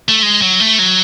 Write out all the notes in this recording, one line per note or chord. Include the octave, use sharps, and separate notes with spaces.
A3
G#3
F#3
A3
F#3